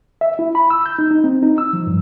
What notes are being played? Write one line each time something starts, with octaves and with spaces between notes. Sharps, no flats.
E5
E4
B5
E6
G6
D#4
D#4
C4
D#4
E6
F3
G2